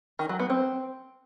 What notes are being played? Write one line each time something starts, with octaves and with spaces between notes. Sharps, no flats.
D#3
F#3
B3
C4